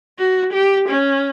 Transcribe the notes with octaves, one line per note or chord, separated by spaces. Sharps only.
F#4
G4
C#4